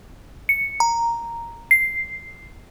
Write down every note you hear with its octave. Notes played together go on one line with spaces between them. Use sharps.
C#7
A#5
C7